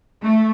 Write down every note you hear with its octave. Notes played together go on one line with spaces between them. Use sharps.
A3